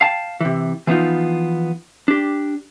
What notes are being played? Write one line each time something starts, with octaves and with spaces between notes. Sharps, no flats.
F5 G5 A5
C3 E3
E3 F3 B3 C#4 D#4 F4
D4 G4